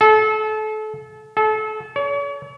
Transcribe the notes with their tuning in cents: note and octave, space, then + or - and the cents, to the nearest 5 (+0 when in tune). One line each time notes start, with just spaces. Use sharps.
A4 -30
A4 -30
C#5 +40